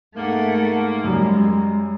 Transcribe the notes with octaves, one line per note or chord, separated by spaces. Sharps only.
G#2 A3 A#3 F#5
F#2 G3 G#3